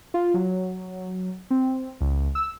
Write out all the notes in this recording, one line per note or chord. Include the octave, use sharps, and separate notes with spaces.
F4
F#3
C4
C#2
E6